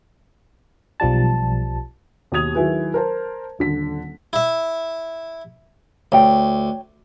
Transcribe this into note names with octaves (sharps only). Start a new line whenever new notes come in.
B1 F3 G3 A5
D#2 B2 G4 D#6 G#6 F7
D#3 F#3 E4 G#4 B4
A#4 C5 A5
D#1 D3 B6
E4 E5
D2 C#5 G5